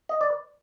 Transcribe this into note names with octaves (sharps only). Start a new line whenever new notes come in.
D#5
D5